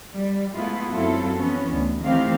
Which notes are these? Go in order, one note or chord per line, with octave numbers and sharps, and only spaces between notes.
G3
G#3 A3 B3 E4 F4
F#2 F#3 C4 E4 F4 A4
E3 B3 C#4
D2
D#3 E3 A3 C4 G4 F5